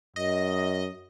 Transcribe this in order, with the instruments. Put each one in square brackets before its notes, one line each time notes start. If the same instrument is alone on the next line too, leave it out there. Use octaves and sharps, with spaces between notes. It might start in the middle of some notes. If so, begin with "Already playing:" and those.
[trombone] F#2 [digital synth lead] D#5